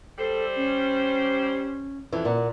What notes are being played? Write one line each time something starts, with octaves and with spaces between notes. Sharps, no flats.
G3 A4 C5
C#4
F2 E3
A#2 F#5